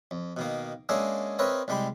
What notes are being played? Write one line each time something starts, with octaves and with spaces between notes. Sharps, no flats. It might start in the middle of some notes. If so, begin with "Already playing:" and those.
F2
B2 D#3 A#3
G#3 A#3 C#4 D4 G#4 E5
C4 A#4 B4 C#5 D#5 E5
C2 G3 G#3 G4 B5